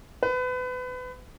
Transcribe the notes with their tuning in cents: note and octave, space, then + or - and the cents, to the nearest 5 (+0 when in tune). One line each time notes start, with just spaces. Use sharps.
B4 +30